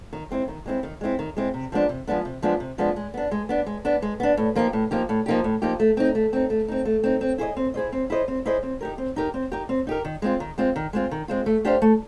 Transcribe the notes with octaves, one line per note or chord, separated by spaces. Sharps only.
D#3
G#3 C4 E4
D#3
G#3 C4 E4
D#3
G#3 C4 E4
D#3
G#3 C4 E4
C3
F3 G#3 B3 D4
C3
F3 G#3 B3 D4
C3
F3 G#3 B3 D4
C3
F3 G#3 B3 D4
G#3
B3 D4
G#3
B3 D4
G#3
B3 D4
G#3
B3 D4
A2
F3 A#3 D#4 G4
A2
F3 A#3 D#4 G4
A2
F3 A#3 D#4 G4
A2
F3 A#3 D#4 G4
A3
C4 D#4
A3
C4 D#4
A3
C4 D#4
A3
C4 D#4
C4
E4 G#4 C5 D#5
C4
E4 G#4 C5 D#5
C4
E4 G#4 C5 D#5
C4
E4 G#4 C5 D#5
C4
D#4 G4 A#4
C4
D#4 G4 A#4
C4
D#4 G4 A#4
C4
D#4 G4 A#4
D#3
G#3 C4 F4
D#3
G#3 C4 F4
D#3
G#3 C4 F4
D#3
G#3 C4 F4
A3
D4 G4 C5 F5
A3